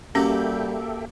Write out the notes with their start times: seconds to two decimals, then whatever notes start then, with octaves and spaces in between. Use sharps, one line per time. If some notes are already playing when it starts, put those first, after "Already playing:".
0.15 G3 A#3 C#4 F#4 G4 A4 E5 G5